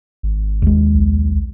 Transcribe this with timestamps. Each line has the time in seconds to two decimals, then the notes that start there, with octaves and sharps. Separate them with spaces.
0.23 G#1
0.62 D#2 G#3
0.95 B1